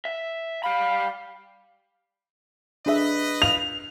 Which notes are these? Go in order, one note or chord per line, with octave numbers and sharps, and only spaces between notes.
E5
G3 F5 B5
D4 G#4 B4 D#5 E5
F5 F7